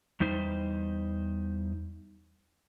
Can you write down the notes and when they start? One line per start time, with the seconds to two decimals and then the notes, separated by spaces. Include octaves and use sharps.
0.20 E2 G3 D#4 C5